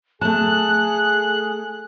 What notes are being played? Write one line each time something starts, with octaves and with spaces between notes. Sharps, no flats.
A3 G#4 A5 F#6